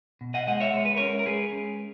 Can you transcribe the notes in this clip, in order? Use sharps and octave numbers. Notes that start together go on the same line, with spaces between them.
B2
D#5 F#5
G#3 D#5 F#5
C#5 E5
G#3 C#5
B4
C#4 A#4 C#5
A#4
G#3 G#4 B4
C#4